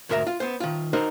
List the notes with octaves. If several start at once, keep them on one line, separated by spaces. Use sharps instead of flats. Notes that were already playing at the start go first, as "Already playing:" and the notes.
D2 G#2 A#4 E5 A#5
F4
B3 C5
D#3 F4
D#4 F#4 A#4 C5 D#5